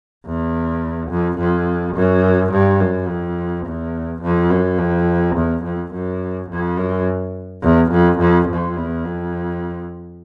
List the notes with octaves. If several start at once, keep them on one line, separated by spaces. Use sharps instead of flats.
E2
F2
F2
F#2
G2
F#2
F2
E2
F2
F#2
F2
E2
F2
F#2
F2
F#2
E2
F2
F2
F2
E2
F2